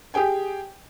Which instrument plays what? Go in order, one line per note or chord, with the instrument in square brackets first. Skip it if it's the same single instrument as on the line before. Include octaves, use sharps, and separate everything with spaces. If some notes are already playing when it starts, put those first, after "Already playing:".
[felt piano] G4 G#4 G5 G#5